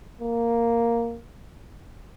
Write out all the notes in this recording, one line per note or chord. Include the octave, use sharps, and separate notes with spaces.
A#3